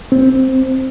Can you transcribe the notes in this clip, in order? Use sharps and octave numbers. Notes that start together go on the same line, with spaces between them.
C4